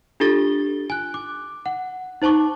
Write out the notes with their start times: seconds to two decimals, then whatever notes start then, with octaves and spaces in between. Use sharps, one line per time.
0.20 D4 F4 G4 A4 A6 G7
0.90 G#5 F#6
1.14 D6
1.66 F#5
2.22 D#4 C5 A5 C#6 D6